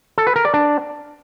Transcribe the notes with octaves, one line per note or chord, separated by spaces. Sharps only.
A4
B4
A#4
D5
D4